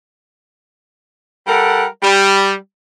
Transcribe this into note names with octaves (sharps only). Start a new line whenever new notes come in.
G3 A4 A#4 F#5
G3